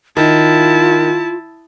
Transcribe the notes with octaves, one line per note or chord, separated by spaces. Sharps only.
D#3 E4 F4 A5